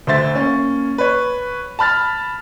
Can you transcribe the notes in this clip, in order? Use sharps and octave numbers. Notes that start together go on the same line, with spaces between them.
D2 D3 C5 E5 A6
A#3 C#4
B4 C#5
A5 B5 F6 A6